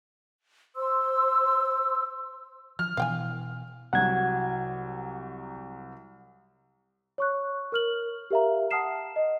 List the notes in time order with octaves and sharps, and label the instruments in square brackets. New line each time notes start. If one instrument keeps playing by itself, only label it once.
[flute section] C5 C6 E6
[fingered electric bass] F3 [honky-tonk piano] F6
[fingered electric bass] B2 E3 [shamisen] F5 G5 G#5
[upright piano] C2 F#3 [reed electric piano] F#5 G#6
[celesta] C#5 C#6 F#6
A#4 F6 F#7
G4 A#4 E5 F5 A#5
F#5 A5 D#6 F6 C7 E7
D#5